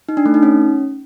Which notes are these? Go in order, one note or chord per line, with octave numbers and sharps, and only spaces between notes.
D#4
D4
A3
D#4
C#4